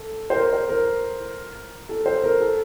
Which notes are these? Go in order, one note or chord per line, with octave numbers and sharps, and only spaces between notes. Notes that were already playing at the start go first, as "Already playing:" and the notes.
Already playing: A4
C5
A#4
C5
A#4
A4
C5
A#4
A4